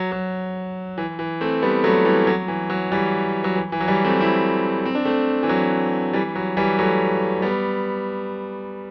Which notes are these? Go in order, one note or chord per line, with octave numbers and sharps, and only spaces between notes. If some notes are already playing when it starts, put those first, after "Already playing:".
Already playing: F#3
F#3
E3
E3
A3 C4
G3 B3
F#3 A3
E3 G3
F#3
E3
F#3
E3 G3
F#3
E3
E3
F#3
E3 G3
A3 C4
C4 E4
C4
D4
A3 C4
E3
F#3
E3 G3
F#3
E3 G3
F#3 A3
G3 B3